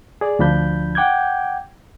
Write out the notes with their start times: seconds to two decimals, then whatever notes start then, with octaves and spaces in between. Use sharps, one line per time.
0.21 G#4 D5
0.39 D2 F3 D4 B5 G6
0.95 F#5 G5 D6 G6 G#6